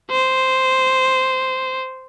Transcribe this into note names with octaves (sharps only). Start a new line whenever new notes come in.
C5